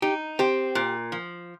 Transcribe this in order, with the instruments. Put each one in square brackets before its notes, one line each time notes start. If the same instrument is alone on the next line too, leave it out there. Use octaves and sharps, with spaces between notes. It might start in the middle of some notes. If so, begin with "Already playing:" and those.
[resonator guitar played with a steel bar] D#4 [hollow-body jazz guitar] G4
[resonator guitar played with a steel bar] C4 [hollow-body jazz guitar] G4
[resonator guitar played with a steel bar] A#2
F3